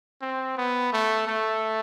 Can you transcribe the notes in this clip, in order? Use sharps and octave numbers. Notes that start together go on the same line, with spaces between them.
C4
B3
A3
A3